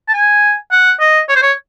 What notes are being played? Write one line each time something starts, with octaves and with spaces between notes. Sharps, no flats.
A5
G#5
F#5
D#5
C#5
C5
C#5